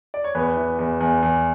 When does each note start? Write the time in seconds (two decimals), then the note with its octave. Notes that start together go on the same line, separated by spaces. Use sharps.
0.14 D5
0.24 C#5
0.35 E2 B3 B4
0.57 E3
0.79 E2
1.00 E2
1.22 E2